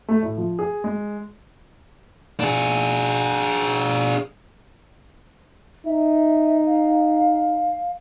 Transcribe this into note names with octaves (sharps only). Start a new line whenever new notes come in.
A3
A2
F3
G#4
G#3
D4 G#4
D#4 E5
F5